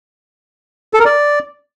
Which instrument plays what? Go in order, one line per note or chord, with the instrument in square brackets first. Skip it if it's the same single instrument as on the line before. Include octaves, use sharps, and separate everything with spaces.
[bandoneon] A4
A#4
D5